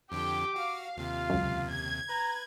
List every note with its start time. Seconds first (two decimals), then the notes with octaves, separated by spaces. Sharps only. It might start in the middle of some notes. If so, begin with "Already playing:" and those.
0.12 F2 D3 F3 G4 G5 D6
0.56 F#4 F5
0.97 D#2 C3 F4
1.30 C#2 F#2
1.69 G#6
2.09 B4 A#5